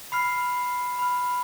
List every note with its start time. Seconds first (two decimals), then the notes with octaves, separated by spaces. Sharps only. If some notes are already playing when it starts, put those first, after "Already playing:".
0.12 B5 F6 C7
0.99 B5 F6